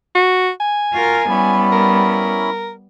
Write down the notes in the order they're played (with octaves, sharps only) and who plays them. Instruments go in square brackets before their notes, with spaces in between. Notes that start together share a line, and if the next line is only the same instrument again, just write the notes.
[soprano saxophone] F#4
G#5
[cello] F4 A#4 [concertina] F#4
[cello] G3 B3 [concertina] C#4 E4 B5
[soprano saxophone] A#4